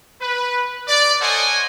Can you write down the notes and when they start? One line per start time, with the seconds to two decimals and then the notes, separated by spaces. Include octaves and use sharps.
0.22 B4
0.88 D5
1.21 A4 C5 C#5 D#5 F#5 G#5